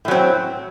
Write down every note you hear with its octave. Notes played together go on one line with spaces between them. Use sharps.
A2 F#3 C4